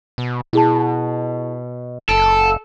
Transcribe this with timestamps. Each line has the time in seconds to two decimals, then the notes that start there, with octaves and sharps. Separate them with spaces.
0.18 B2
0.53 B2 E4 G#4 A5
2.09 F#1 A4 D7